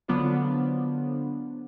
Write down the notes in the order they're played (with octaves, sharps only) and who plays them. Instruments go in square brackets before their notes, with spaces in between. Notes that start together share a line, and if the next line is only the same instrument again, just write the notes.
[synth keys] D3 F#3 B3 D4 F4 C5